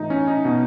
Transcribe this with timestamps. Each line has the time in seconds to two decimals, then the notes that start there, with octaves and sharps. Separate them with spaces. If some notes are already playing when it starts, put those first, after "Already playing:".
Already playing: A2 E3 D#4
0.10 C#4
0.28 D#4
0.45 B2